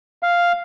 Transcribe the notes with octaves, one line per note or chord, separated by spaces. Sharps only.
F5